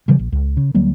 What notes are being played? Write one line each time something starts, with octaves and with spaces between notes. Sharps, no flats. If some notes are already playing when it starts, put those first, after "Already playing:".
C#3 E3 F#3 G3
A#1
C#2
C#3
D2 F#3 G3 A#3